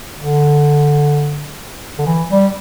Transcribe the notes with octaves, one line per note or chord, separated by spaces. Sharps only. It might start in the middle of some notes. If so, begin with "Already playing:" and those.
D3
D3
E3
G3